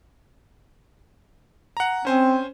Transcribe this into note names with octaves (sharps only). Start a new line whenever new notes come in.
F#5 A#5
C4 C#4 C5 G#5